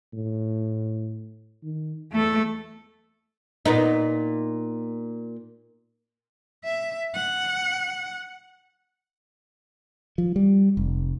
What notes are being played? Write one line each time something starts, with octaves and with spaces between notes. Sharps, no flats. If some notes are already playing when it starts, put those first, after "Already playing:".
A2
D#3
E2 A3 A4
A#2 B3 D#4
E5
F#5
F3
G3
F1